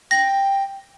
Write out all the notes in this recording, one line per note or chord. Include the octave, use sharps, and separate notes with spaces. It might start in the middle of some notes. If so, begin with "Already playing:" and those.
G5 A#6